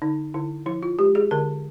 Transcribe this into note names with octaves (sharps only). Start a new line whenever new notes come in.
D3 D#4
D3 E4
F3 E4
F4
G#3 G4
G#4
D3 A#4